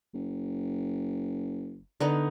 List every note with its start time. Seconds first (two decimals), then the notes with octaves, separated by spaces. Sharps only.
0.14 F#1
2.00 D3 B3 D#4